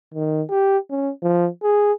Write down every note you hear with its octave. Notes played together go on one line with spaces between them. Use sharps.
D#3
G4
C#4
F3
G#4